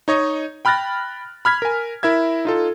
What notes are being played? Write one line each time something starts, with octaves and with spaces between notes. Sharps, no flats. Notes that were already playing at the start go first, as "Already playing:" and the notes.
D#4 C#5 D#5
G5 B5 F6 F#6 A6 A#6
B5 F6 G#6 B6
A#4 G#5
E4 A#4 E5 G#6
D#4 F4 A4